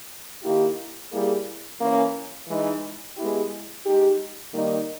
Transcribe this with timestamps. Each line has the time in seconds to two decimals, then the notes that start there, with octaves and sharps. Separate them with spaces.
0.43 D#3 A#3 E4 G4
1.12 G3 A#3 E4 G#4
1.81 E3 A#3 C#4
2.48 E3 G#3 D#4
3.17 G#3 B3 E4 G4
3.86 G#3 D#4 G4
4.54 D#3 G3 A#3 D#4